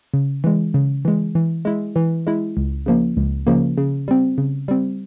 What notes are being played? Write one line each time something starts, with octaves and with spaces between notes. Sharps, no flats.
C#3
E3 G#3
C#3
E3 G#3
E3
G#3 E4
E3
G#3 E4
C#2
C#3 F3 A#3
C#2
C#3 F3 A#3
C#3
G3 C4
C#3
G3 C4